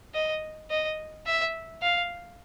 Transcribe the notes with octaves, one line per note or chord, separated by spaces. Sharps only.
D#5
D#5
E5
F5